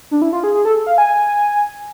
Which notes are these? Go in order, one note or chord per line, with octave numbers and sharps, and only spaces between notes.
D4
E4
F4
G#4
G#4
A4
F5
G#5